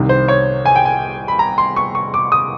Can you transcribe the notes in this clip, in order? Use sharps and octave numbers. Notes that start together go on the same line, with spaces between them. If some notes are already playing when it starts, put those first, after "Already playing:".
Already playing: C2 C3 D#3
C5
C#5
G#5
G5
G#5
B5
A#5
C6
C#6
C#6
D6
D#6